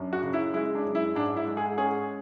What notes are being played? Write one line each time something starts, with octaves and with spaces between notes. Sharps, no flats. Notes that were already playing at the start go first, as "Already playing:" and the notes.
Already playing: F#2 D4
F#4
C#3
E4
G#3 E4
D4
F#2
E4
G#2 D4
E4
G#3
G#4
C#4 G#4